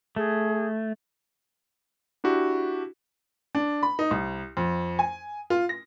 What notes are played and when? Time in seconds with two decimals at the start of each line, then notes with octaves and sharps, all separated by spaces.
0.16 A3 G#4
2.24 D4 E4 F#4 G4
3.55 D4
3.83 B5
3.99 D#4
4.11 C2
4.57 F2
4.99 G#5
5.50 F4
5.69 A#6